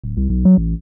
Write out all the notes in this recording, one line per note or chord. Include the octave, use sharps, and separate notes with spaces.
D1
C2
B1
F#3
A1